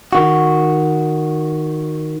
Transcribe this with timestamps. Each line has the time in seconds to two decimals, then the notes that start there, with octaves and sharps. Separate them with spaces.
0.13 D#3 F#4